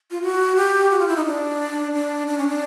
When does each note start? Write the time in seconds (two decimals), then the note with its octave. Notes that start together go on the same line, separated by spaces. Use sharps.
0.11 F4
0.22 F#4
0.56 G4
0.91 F#4
0.99 F4
1.08 E4
1.16 D#4
1.25 D4
1.93 D4
2.27 D4
2.38 C#4
2.48 D4